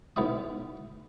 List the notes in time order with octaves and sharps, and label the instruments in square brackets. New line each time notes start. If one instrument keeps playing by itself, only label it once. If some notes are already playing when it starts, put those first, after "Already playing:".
[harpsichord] B1 B3 E4 E5 D#6